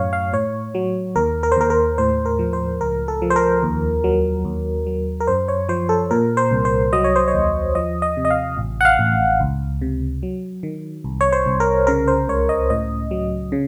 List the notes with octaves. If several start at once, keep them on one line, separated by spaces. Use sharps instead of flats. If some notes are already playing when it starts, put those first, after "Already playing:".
Already playing: F#2 A2 F#3 C#5 F5
F5
A2 C#5
F#3
D#2 A#4
A#4
C5
D#2 A#4
A#4
A2 C5
A#4
F3
C5
C#2 A#4
A4
F3
C5
A#4
D#2
F#3
D#2
F#3
A#4
F#2 C5
C#5
F3 C5
A4
A#2 A#4
C5
C2
C5
F#3 D#5
C#5
C5
C#5
D#2
F3 D#5
D#5
C3
D#5
F5
A1
F#5
F5
A1
C#2
C3
F#3
D#3
C2
C#5
C5
C2
A#4
C#3 A#4
C5
C#2 C#5
D#5
A2 D#5
F#3
C#3